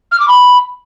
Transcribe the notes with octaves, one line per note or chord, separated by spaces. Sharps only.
F6
D6
B5